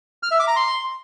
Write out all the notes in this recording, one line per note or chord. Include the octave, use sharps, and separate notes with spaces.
F6
E5
D6
A#5
C6